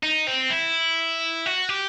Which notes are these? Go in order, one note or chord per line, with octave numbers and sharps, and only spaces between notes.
D#4
C4
E4
F#4
G4